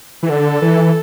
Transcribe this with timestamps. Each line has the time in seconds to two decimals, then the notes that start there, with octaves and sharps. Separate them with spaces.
0.23 E3
0.29 D3 A4
0.62 E3